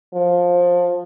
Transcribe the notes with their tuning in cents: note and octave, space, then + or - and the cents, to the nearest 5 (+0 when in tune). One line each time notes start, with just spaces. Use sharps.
F3 +15